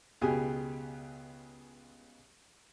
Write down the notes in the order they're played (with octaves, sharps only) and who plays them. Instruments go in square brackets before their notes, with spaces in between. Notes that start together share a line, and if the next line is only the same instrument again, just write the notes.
[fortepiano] C#2 B2 G4 G#4 G#5